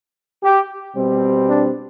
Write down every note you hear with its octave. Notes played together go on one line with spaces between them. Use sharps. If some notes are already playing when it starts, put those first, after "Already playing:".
G4
B2 G3 C4
D4